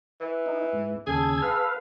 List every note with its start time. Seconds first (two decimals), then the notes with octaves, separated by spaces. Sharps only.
0.21 E3
0.46 D#4
0.73 G#2
1.07 D#2 C#3 G#4 A5 E6 G#6
1.42 B4 F5